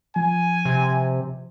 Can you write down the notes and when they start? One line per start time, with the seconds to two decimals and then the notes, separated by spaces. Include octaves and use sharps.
0.16 F3 G#5
0.65 C3